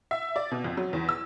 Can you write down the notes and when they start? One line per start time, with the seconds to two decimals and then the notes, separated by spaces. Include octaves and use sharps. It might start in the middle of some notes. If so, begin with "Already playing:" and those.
0.11 E5
0.36 D5
0.51 B2
0.64 F2
0.77 F#3
0.93 E2
1.09 E6